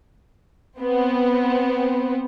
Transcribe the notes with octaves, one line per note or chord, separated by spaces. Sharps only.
B3 C4